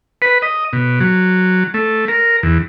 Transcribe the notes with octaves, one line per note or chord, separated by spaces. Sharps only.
B4
D#5
B2
F#3
A3
A#4
E2